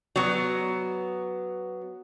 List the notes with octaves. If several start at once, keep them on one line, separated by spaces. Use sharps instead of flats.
F#3 B3